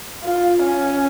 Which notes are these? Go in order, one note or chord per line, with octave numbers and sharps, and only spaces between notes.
F4
C#4